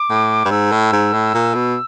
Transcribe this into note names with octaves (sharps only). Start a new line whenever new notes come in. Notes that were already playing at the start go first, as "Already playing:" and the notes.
Already playing: D6
A2
G2
G#2 E6
A2
G#2
A2
A#2
B2